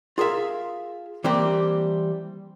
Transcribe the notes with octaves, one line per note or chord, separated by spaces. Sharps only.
F4 G#4 A#4 E5 F5
E3 G3 A#3 C4 G4 C5